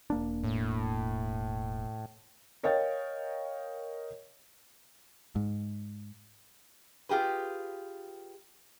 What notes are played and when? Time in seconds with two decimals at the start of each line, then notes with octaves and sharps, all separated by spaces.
0.10 E1 A#3 D4
0.44 A2
2.63 A#4 C#5 D#5 F5 G5 A6
5.36 G#2
7.09 F4 G4 G#4 B4